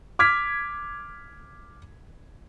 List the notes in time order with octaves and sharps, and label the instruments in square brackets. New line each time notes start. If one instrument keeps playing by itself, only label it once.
[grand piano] D6 F6 G#6 B6